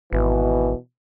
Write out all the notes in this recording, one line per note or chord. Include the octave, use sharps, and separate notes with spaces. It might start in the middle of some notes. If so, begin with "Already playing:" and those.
G#1 B2 E3